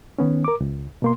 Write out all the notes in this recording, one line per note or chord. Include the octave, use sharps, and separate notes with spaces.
D#3 B3 C#4
A#4 D6
C#2
B2 A#3 C6